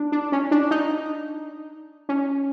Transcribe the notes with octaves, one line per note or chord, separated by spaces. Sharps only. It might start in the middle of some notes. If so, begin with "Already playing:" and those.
Already playing: D4
D4
C#4
D4
D#4
C#4